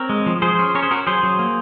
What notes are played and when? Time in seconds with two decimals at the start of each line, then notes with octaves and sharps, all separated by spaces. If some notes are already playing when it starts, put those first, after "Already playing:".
Already playing: C4 A#4 C#5
0.09 G#3
0.26 F3
0.42 F3 G#4 C5
0.59 C#4
0.75 C#4 A#4 C#5
0.83 G#4 C5
0.91 C#4 F#4 A#4
1.07 F#3 G#4 C5
1.23 F#3
1.39 A#3